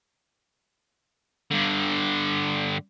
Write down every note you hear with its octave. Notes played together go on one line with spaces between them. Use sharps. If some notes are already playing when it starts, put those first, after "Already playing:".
G2 D3